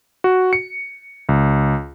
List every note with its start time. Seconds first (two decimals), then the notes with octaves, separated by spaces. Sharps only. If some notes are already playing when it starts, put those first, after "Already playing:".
0.24 F#4
0.53 C#7
1.29 C#2